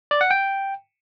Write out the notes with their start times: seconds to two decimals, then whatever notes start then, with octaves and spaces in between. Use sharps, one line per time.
0.11 D5
0.21 F#5
0.31 G5